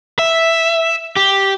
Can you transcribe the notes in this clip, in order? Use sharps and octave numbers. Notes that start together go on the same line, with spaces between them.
E5
G4